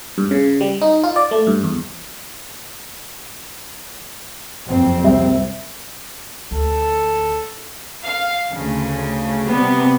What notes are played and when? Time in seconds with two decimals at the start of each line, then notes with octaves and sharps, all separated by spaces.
0.18 G2
0.31 C#3
0.61 G3
0.82 D#4
1.03 F4
1.16 D5
1.31 A3
1.47 G2
1.63 E2
4.67 F#1 F2 C4
5.04 C2 G3 E5
6.51 D2 A4
8.04 F5
8.55 D2 C#3
9.50 C3 G3 B3